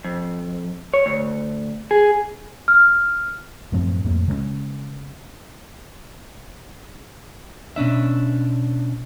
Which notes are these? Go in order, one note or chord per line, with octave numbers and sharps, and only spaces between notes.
F2
C#5
D2
G#4
F6
F#2 A2 F3 C4
F2 A2 A#3
C#3 G#3 A#3 C#4
B2 C#4 D4 E5